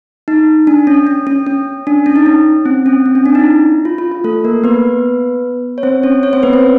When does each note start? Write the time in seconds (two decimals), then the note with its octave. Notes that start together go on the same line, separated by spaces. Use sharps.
0.28 D#4
0.67 D4
0.87 C#4
1.07 C#4
1.27 C#4
1.46 C#4
1.87 D4
2.06 C#4
2.16 D#4
2.26 C#4
2.65 C4
2.86 C#4
3.06 C4
3.15 C#4
3.26 D4
3.35 D#4
3.46 E4
3.85 F4
3.98 F4
4.12 F4
4.24 A3 A4
4.45 A#3 A#4
4.64 B3 B4
5.78 C#5
5.83 C4 C5
6.03 C#4 C#5
6.23 C#4 C#5
6.33 C4 C5
6.43 B3 B4
6.53 C4 C5